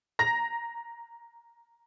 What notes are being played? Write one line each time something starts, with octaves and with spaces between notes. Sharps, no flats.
A#5 A#6